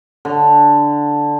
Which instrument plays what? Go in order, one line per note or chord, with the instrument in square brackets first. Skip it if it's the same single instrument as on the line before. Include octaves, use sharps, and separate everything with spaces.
[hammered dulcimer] D3